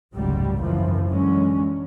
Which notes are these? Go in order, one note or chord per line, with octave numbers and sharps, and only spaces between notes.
F1 C#2 G#2 F#3 G3
G#1 F#2 E3 F3
D3 E3 F#3 G#3 C#4